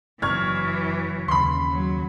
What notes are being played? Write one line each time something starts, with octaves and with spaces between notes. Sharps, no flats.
F#1 E3 F#3 C#6 F6 G#6
D#2 C#3 B5 C6
F#3